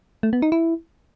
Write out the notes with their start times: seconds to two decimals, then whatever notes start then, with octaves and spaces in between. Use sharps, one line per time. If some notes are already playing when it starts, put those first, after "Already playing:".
0.23 A3
0.33 B3
0.42 D#4
0.52 E4